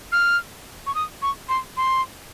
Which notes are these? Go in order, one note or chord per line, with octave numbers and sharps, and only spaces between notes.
F6
C#6
D#6
C#6
C6
C6